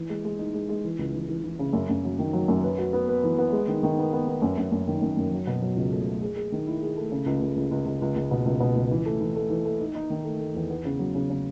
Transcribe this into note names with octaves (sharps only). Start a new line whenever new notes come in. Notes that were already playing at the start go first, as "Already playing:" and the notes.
Already playing: E3
G#3
G#3
D#4
G#3
G#3
E3
C#2
E3
E3
E3
C#3
F#2
F#2
F#3
D#3
F#3
F#2
B4
F#4
B3
B4
E3
B3
G#3
D#3
D#3
B3
B3
B3
F#2
F#2
F#2
D#3
F#2
F#2
F#3
B2
F#3
C#2
A3
A3
G#4
G#4
D#3
E4
G#4
A3
C#3
C#2
C#2
C#2
C#2
C#2
C#2
C#2
B2
C#2
B2
C#2
E3
A3
E3
A3
E3
A3
D#4
D#4
D#3
A3
A3
E2
B3
C#3
F#3
C#3
C#3